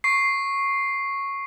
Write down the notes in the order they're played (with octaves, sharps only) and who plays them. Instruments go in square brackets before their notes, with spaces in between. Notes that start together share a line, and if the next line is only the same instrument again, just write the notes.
[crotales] C#6 C7